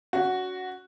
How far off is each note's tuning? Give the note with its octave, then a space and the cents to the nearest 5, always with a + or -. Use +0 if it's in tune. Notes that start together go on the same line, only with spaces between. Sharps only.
C#4 +40 F#4 +0